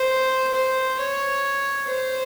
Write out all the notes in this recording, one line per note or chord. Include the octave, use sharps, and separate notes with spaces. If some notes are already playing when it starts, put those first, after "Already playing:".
Already playing: C5
C5
C#5
C5